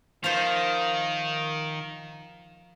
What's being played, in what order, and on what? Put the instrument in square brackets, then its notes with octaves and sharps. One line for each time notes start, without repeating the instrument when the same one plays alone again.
[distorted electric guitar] D#3 [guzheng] F3 C5